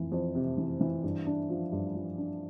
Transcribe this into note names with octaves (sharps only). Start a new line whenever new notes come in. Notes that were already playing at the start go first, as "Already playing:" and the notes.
Already playing: F2 E3
F2
C3
E3
E3
G2
D4
F3
G2
F3
D4